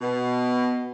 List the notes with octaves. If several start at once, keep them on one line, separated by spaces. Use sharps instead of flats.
B2